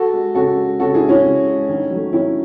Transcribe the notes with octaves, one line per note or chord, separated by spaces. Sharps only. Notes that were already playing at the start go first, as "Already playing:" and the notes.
Already playing: F#4 A4
G#3
C#3 F#4 A4
G#3
C#3 F#4 A4
E4 G#4
G#3
C#4 E4
C#3
G#3
D#3
F#3 A3
D#3 C#4 E4